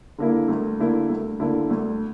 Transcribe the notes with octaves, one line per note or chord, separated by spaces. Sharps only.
D3 A#3 E4
D2
D3 A#3 E4
D2
D3 A#3 E4
D2